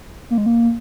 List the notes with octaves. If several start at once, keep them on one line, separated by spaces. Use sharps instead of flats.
A#3
G#3
A#3